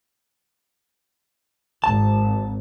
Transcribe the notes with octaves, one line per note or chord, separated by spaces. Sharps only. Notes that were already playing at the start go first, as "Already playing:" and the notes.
G#1 A5